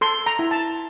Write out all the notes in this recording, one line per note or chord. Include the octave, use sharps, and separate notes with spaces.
A4 C6
A#5
E4
A5